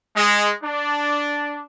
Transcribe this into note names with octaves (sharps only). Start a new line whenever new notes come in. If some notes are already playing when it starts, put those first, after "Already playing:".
G#3
D4